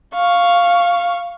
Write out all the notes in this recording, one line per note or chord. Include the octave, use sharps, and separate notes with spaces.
F5 C#6